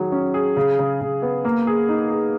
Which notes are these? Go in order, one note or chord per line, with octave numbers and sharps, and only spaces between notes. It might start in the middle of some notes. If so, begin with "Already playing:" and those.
Already playing: D#3 F#3 G#4
C#4
G#4
C#3
C#3
C#3
B3
A#3
G#4
D#4
G#4